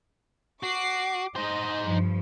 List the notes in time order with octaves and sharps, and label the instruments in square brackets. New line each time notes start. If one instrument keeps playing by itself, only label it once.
[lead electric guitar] F#4 [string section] D6 C7
[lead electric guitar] D#4 C5 [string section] D#5
[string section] G2 F3